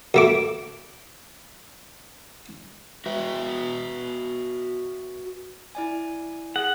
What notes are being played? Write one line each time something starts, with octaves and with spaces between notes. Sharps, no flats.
D2 A3 D6
F#4 B4 E5
E4 D5 G#5
G#4 F#5